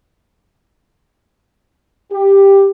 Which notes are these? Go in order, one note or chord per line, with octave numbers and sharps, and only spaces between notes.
G4